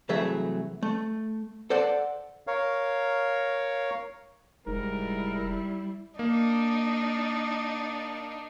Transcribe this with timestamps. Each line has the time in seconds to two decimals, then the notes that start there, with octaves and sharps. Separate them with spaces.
0.09 C2 E3 F#3 A3 G#4 E5
0.83 A3
1.70 A4 C5 D5 F#5
2.47 A#4 C#5 F5
4.67 F1 G#2 G3 E4 A#4
6.19 A#3 D4 D#4